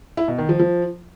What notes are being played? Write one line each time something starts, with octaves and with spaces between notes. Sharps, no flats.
E4
B2
D#3
F3
F3